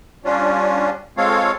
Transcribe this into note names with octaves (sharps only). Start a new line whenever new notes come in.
G3 C#4 D4 F4
G#3 C4 F4 A4 C#5 F5